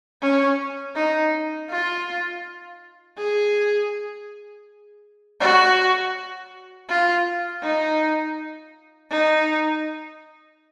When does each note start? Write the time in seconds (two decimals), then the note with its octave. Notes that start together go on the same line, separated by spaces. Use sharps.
0.22 C#4
0.96 D#4
1.70 F4
3.18 G#4
5.41 F#4
6.89 F4
7.63 D#4
9.11 D#4